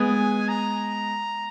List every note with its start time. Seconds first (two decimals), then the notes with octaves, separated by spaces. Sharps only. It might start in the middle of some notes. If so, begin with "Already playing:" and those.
Already playing: G#3 B3 G#5
0.49 A#5